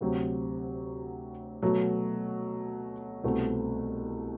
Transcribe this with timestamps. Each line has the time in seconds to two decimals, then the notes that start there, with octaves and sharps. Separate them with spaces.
0.01 D2 C3 F#3 C4 G4
1.62 B2 F#3 A3
3.24 C2 B2 A3 C4 F#4